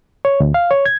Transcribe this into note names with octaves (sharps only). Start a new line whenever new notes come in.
C#5
D2
F5
C#5
G#6